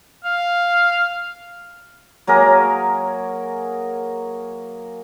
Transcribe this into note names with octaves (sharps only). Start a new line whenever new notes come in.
F5
F#3 A#3 G#4 A#4